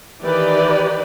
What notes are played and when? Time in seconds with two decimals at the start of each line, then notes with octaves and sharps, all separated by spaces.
0.23 D#3 E3 G4 B4 D5